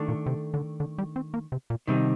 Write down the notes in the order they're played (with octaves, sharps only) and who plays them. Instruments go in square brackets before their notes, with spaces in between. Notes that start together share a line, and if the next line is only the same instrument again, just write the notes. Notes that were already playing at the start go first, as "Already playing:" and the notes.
Already playing: [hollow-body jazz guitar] D#3 A3 D4 A4 D5
[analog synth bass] A#2
C3
D3
D3
G3
C4
A#3
C3
A#2
[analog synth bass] C3 [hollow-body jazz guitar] D#3 G3 C4 D#4